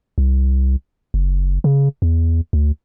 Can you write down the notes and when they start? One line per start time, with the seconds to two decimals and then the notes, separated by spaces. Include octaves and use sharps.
0.18 C2
1.14 F#1
1.64 C#3
2.02 E2
2.53 D2